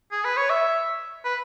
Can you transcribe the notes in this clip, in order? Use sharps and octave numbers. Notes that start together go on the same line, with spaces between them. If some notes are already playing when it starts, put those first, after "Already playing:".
G#4
B4
C#5
E5
B4